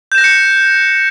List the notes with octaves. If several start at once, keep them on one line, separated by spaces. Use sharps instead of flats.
F#6 G6 A#6 C#7 E7